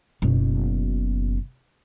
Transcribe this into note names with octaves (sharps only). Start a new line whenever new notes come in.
F#1 B2